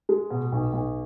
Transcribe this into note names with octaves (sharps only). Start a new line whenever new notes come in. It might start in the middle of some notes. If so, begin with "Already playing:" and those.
G#3
B2
B1
B1